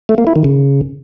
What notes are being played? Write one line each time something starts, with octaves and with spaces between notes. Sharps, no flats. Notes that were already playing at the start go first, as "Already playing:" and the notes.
A3
A#3
E4
D#3
C#3